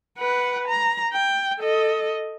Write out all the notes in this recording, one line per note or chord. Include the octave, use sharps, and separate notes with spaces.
B4 F#5
A#5
G5
A4 D#5